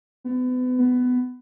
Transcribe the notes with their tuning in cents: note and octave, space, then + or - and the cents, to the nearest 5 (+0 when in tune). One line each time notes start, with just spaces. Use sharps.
B3 +35
B3 +15